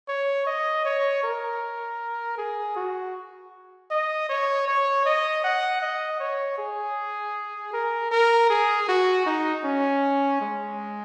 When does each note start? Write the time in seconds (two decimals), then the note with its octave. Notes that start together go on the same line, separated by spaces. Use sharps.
0.09 C#5
0.47 D#5
0.85 C#5
1.24 A#4
2.38 G#4
2.76 F#4
3.91 D#5
4.29 C#5
4.68 C#5
5.06 D#5
5.44 F#5
5.82 D#5
6.20 C#5
6.59 G#4
7.73 A#4
8.12 A#4
8.50 G#4
8.88 F#4
9.26 D#4
9.65 C#4
10.41 G#3